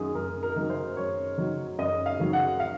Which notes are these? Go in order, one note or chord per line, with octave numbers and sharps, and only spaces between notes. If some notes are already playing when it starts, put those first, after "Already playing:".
Already playing: F#2 D#3 F#3 G#4
F#2 A#4
A#4
D#3 F#3
C5
F#2 C#5
D#3 F#3
F#2 D#5
F5
D#3 F#3
F#5
F5